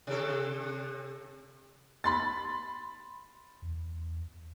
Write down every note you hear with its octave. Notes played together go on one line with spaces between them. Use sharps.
C3 A4
B5 C6 A6
E2